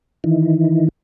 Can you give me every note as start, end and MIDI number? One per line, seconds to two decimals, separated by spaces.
0.24 0.88 51
0.24 0.88 52